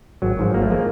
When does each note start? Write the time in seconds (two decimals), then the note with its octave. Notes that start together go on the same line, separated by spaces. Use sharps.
0.22 G#1 F#3
0.39 G#2 F3
0.54 G#1 A#3
0.62 A3
0.70 F3 G#3 A#3